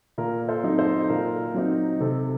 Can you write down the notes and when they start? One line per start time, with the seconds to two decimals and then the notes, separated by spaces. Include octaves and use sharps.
0.18 A#2 A#4
0.48 A4 C5
0.64 F#3 C4 D#4
0.78 A4 C5
1.09 A#2 A#4
1.54 F#3 C4 D#4
2.00 C3 A4